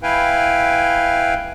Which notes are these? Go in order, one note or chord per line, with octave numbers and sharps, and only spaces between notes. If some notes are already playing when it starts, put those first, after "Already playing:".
E4 B4 F5 G5 G#5